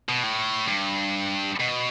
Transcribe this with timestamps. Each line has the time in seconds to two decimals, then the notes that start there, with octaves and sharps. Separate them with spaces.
0.09 B2
0.23 A2
0.68 G2
1.60 B2